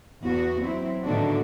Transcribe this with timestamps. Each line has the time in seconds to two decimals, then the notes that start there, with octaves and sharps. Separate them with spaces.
0.23 E2 B3 F#4
0.63 F#3 C4 E4
1.04 A2 D3 D#3 B3 D4 F#4